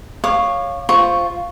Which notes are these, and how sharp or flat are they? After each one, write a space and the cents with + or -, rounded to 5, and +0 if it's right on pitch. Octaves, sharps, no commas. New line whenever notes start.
C#5 -5 F5 +0 D6 +40
F4 +0 C5 +0 C#6 +0